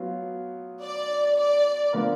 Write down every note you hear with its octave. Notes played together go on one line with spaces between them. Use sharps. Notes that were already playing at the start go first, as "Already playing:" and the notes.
Already playing: F#3 B3 F4
D5
D5
D3 F3 B3 F4 A#4